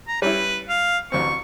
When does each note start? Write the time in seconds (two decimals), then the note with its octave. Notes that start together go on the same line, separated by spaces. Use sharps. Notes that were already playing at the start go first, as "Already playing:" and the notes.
0.08 A#5
0.22 G3 C#4 E4 B4
0.69 F5
1.12 A1 D2 C4 C#6